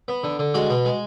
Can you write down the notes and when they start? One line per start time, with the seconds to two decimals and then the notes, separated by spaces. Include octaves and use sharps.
0.08 B3
0.24 D3
0.39 D3
0.54 G#3 F#4
0.70 B2
0.85 G#3